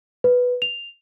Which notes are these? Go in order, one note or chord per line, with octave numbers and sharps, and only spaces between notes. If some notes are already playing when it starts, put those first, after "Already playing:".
B4
F7